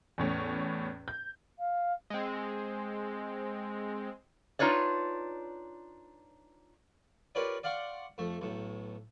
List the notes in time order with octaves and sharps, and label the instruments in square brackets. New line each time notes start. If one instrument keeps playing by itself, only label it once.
[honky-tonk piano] E2 A2 C#4
G6
[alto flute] F5
[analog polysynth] G#3 C4
[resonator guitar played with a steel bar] D4 D#4 F4 B4 C#5 D5
[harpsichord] F4 G4 A#4 B4 C#5 D5
D5 F5 F#5 C6 C#6
F2 A3
B1 A2